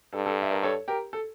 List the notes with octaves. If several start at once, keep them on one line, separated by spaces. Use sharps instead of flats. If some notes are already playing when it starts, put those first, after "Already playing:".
G2 A4
A4
E5
A#4 D5
A4 C#5
G4 A#4
A4